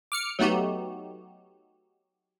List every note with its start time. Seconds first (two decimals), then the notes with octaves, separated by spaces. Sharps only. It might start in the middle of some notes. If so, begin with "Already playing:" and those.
0.12 D6 F6 C#7
0.39 F#3 A3 B3 D#4 F#4 G4